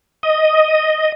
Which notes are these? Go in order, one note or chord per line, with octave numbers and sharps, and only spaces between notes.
D#5